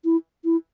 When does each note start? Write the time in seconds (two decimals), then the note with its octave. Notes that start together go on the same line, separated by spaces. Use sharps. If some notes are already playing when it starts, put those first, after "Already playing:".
0.05 E4
0.45 E4